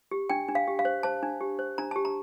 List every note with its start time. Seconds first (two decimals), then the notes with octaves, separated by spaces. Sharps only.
0.11 G4
0.30 D4 G5
0.48 D4
0.55 F5
0.67 G4
0.79 F5
0.85 C5
1.03 C5 A5
1.23 D4
1.41 G4
1.59 C5
1.78 D4 A#5
1.91 G4 A5
2.05 A#5